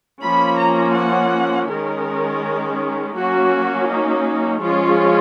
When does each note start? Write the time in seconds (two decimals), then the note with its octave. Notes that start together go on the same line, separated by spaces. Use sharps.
0.23 F3 A#3 C#4 B5
0.60 A#5
0.96 F#5
1.70 D#3 G#3 C#4 A#4
3.15 F#3 A#3 C#4 F#4
3.89 D#4
4.61 F3 G#3 C#4 F4